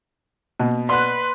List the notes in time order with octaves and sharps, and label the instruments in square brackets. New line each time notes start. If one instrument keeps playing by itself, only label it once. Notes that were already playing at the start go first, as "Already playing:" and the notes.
[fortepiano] B2 [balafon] A#3
[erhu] B4 [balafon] D5 F#5 [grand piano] C6 F#6